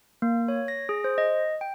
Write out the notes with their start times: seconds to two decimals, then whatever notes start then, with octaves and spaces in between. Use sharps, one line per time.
0.22 A#3
0.48 C#5
0.68 A#6
0.89 G#4
1.04 C5
1.18 D#5
1.61 G5